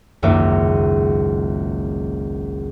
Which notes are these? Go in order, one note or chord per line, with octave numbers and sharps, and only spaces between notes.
G#1 C#2 F#2 A#3 E5 D6